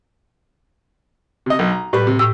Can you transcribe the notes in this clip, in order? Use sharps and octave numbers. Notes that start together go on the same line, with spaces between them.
C3 D#5
B1
A#5
A2 G3 B4 B5
C3
A2 G4 E6